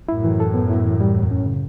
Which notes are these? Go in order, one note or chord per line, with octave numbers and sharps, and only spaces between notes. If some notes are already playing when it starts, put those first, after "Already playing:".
F#2 A2 E4
E3
A4
B3
E4
E3
G3
E2
C#4
C#3